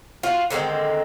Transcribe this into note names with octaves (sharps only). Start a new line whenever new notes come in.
F4 F#4
D3 D#3 G#3 C4